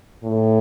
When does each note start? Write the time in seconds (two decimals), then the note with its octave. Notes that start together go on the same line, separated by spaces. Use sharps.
0.24 A2